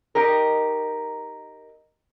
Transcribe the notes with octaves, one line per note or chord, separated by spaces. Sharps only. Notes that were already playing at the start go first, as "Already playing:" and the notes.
D#4 G4 A#4